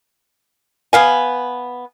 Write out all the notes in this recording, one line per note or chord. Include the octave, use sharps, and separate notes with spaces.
B3 F5 G#5